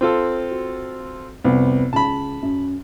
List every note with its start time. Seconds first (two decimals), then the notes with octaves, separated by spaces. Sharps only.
0.01 C4 F4 A4
0.51 F#4
1.44 C2 F2 B3 C5
1.93 C#2 A5 B5
2.42 F#2